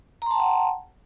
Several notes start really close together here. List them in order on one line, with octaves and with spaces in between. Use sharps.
A#5 C6 A5 G5 F#5